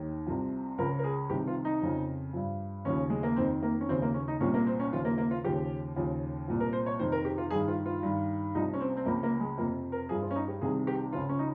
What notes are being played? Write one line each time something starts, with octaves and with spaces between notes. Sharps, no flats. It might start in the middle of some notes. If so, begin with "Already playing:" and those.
Already playing: D#2 D#3
C2 C3 F3
C#2 C#3 F3 A#4
A#4
G#4
C2 C3 D#3 G4
F4
D#4
F2 C#3 F3
G2 F3
D#2 C#3 F3 C#4
G#3
A#3
F2 D#3 C4
A#3
C#4
D#2 C#3 F3 C4
A#3
C#4
D#4
C2 A#2 F3 C#4
A#3
C4
C#4
D#2 C#3 F3 F4
A#3
A#3
F4
D#2 C#3 F3 G4
D#2 C#3 F3
C2 A#2 F3
A#4
C5
C#5
F2 C3 D#3 C5
A#4
G4
F4
G2 D#3 G#4
F4
F4
G2 D#3
C2 C3 F3 D#4
C#4
C4
C4
C#2 C#3 F3 A#3
A#3
G#3
F2 C3 F3 A#3
A#4
G2 F3 G#4
F4
C#4
D#4
G4
C2 C3 D#3 G#4
G4
C#2 C#3 F3 F4
C#4
D#4